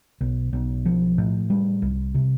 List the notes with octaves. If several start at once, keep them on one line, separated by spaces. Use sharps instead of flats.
B1
B1
F3
A2
G3
C2
C3